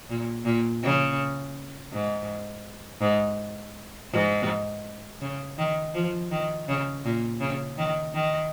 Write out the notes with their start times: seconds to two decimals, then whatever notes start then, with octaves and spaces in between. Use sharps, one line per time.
0.10 A#2
0.45 A#2
0.83 C#3
1.92 G#2
3.01 G#2
4.12 G#2
5.21 C#3
5.58 D#3
5.94 F3
6.31 D#3
6.68 C#3
7.05 A#2
7.40 C#3
7.78 D#3
8.14 D#3